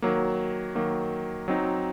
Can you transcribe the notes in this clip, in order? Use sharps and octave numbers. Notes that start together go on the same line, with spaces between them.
D#3 F#3 A#3
D#3 F#3 A#3
F#3 C4 D#4